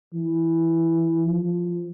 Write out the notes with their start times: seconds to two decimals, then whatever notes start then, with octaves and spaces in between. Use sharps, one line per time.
0.14 E3
1.26 F3